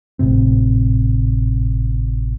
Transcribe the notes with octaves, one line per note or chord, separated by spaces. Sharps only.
G#1 A2 C3 C4